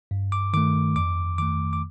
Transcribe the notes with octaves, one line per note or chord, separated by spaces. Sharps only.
G2
D6
D#3 A3 D6
F2 D6
D#3 A3 D6
D6